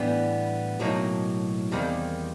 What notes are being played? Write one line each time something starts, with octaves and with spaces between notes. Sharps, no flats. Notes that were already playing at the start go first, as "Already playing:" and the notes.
Already playing: A2 E3 G3 B3 D4
B1 A2 F#3 A#3 D#4
E2 C3 D#3 G3 A#3